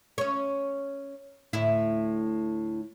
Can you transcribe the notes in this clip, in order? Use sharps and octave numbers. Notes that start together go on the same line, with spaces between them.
C#4 C#5
D2 A2 E4